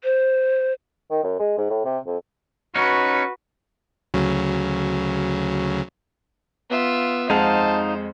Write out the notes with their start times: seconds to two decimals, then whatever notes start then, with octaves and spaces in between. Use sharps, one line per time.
0.04 C5
1.10 D#3
1.24 F#2
1.39 G#3
1.58 G#2
1.70 A2
1.85 C3
2.07 F2
2.75 C#4 D#4 F#4 B4
4.14 D2 C#3 F#3
6.70 B3 F4 E5
7.30 F2 G#3 D#4 C5 F5 F#5 A5